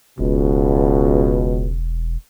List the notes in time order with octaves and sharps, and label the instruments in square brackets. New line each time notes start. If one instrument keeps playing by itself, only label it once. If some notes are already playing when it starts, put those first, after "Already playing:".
[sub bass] E1 [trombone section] C#2 B2